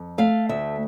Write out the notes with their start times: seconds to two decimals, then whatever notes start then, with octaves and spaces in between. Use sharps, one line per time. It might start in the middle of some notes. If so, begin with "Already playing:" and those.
Already playing: F2
0.18 A3 F5
0.49 D2 E5